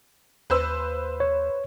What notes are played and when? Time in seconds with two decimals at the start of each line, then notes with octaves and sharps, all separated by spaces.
0.50 D#2 B4 C5 E6
1.20 C#5